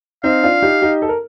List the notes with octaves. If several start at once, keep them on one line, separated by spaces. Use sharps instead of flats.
C4 D#4 F5
D4 F4
D#4 G4
D#4 G4
A4
A#4